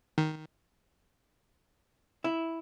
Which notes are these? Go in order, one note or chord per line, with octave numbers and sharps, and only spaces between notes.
D#3
E4